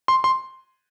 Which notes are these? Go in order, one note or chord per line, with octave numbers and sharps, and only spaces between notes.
C6
C6